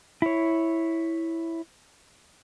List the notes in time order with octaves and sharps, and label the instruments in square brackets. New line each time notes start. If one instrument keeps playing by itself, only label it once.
[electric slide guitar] E4 C#5